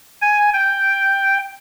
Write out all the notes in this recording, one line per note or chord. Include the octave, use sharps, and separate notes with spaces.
G#5
G5